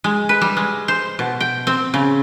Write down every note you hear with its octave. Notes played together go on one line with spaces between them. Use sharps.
G#3
B4
G3
G#3
C5
B2
G5
C4
C#3